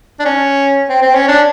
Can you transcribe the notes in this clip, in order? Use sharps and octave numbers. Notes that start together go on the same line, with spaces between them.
D4
C#4
C4
C4
C#4
D4